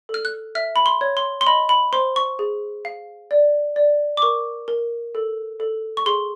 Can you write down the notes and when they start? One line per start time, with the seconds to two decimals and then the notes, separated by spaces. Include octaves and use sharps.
0.09 A4
0.14 F6
0.25 F#6
0.55 E5 F6
0.76 B5
0.86 C6
1.01 C#5
1.17 C6
1.41 C6
1.47 D#5 B5
1.69 B5
1.93 C5 C6
2.16 C#6
2.39 G#4
2.85 F5
3.31 D5
3.76 D5
4.17 D6
4.22 A#4 C#6
4.68 A#4
5.15 A4
5.60 A4
5.97 C#6
6.06 G#4 C6